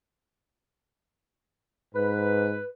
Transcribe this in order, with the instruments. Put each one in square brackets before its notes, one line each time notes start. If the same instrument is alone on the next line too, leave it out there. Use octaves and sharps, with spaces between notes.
[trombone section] G#2 [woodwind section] B4